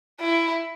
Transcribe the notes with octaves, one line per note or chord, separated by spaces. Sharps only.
E4